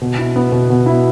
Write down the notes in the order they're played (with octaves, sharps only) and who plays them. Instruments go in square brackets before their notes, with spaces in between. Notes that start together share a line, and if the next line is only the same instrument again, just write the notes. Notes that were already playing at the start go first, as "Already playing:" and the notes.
[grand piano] B2
E4
B3
B2
B2
E4